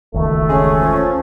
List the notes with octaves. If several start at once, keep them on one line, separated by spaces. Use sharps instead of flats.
E1 C#2 D#3 A3
C#4 G#4
F3